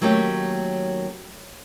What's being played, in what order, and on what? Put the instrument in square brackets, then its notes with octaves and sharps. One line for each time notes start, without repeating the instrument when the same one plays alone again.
[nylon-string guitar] D#3 F#3 A3 A#3 C#4 G4